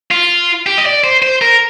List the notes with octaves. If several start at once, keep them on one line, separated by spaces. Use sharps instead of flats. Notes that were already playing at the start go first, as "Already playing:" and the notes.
F4
G4
D#5
D5
C5
C5
A#4